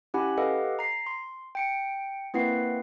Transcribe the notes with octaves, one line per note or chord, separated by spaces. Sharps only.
C#4 E4 G4 F#5 G#5 B5
G4 A4 B4 D#5 F5 F#5
A#5 C7
C6
G5 C#7 D7
A#3 C4 E4 B4 F#5 C7